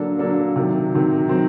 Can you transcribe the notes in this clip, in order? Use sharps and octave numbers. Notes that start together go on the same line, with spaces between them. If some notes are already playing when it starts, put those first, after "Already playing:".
Already playing: D3 F#3 A#3 D4 A4
D3 F#3 A#3 D4 A4
C3 D#3 F#3
C3 D#3 F#3
D#3 F#3 C4